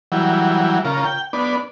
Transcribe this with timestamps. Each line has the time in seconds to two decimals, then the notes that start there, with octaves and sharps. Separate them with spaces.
0.12 E3 F#3 G3
0.85 C#3 F4 A#4
1.05 G5
1.33 B3 D4